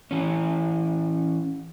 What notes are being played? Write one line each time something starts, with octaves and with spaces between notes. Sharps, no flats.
E3 C#4